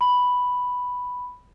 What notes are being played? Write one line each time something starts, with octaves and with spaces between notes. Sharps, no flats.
B5